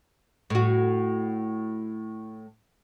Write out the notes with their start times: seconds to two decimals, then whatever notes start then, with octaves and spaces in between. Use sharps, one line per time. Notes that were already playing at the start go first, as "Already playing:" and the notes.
0.50 A2 F#4